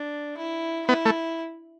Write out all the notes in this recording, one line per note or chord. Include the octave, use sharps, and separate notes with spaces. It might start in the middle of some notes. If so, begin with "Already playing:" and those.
Already playing: D4
E4
B3 E4
A3